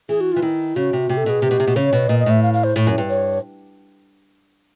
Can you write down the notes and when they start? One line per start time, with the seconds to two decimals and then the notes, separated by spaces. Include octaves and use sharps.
0.09 E3 G#4
0.21 F#4
0.32 E3 F4
0.42 D#3 E4
0.76 C#3 F#4
0.93 C3
1.09 C3
1.17 A4
1.26 B2 G#4
1.42 C3 G4
1.51 B2
1.60 C3
1.67 B2
1.76 C#3 C#5
1.93 B2
2.09 A#2 D#5
2.20 D#5
2.26 A2 E5
2.43 F5
2.54 F5
2.64 C5
2.76 A2
2.87 F#2
2.98 G2
3.09 C#5